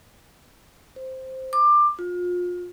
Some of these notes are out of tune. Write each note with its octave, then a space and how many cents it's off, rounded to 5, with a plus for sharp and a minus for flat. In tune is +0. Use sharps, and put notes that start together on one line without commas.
C5 +0
D6 +20
F4 +30